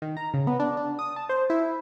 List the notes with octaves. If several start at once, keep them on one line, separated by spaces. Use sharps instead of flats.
D#3
A#5
C#3
B3
D4
D4
D#6
A5
C5
E4